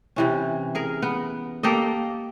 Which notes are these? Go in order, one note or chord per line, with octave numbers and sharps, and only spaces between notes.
C3 E3 C#4
G#4 A#4
B3
A#3 G4 A4 D#5